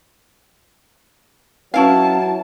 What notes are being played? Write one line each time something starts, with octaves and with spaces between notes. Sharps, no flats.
E3 F#3 C#4 E4 F5 A5